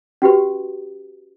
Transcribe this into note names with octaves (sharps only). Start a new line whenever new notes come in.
C#4 F#4 G4 B4